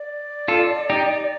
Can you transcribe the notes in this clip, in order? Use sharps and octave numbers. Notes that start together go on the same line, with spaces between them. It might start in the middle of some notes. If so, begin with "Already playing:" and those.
Already playing: D5
F4 A4
D#4 G4